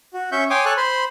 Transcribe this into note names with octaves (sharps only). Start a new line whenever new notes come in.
F#4
C#4 E5 C#6 G6
C#5 G5 G#5 C6 D6 D#6
A4 C#5 G#5 A5 F#6
C5 B5 C6